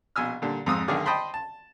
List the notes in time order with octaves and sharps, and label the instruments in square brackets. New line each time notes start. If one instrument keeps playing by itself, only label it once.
[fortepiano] A#1 B2 G#5 E6 F6
A#2 D3 G3
F2 G#2 D#6 E6
B1 D3 D#3 G#4 D5 F5
C5 D#5 G5 A5 B5 C6
A5